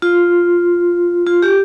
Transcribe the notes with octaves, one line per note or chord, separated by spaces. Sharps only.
F4
F4
G4